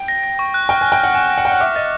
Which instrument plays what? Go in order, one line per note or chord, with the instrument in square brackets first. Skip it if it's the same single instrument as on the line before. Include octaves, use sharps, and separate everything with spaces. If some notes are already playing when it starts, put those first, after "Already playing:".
Already playing: [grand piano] G5
[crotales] A#6
A#6
C#6
F#6
[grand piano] G5 [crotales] F6
[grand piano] G#5
[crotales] F6
[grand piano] G5
[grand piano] F#5 [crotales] F6
[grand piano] G#5 [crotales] E7
[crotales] A#6
[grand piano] F#5
[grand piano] G5 [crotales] C#7
[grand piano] F#5
[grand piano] E5 [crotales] D6
[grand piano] D#5 [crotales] A6